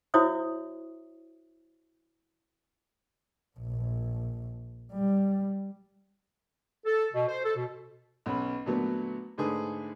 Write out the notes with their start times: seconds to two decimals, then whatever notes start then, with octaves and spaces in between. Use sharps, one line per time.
0.14 E4 F#4 C5 C#5 E5 D#6
3.58 A#1
4.92 G3
6.86 A4
7.13 B2
7.27 C5
7.43 A4
7.56 B2
8.26 B1 C#4 B5
8.66 A#2 D3 F#3 A3 B3
9.38 G#2 D3 A3 G#4 B4 D#6